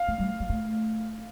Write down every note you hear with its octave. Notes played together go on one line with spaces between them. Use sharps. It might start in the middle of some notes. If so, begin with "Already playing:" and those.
Already playing: F5
A3
G3
G3
A3